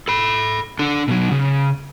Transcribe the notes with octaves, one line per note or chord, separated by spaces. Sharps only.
A4 B5
D4 A4
B2 F#3
C#3